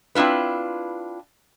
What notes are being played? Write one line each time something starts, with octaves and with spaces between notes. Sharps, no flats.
C4 D4 E4 F4 B4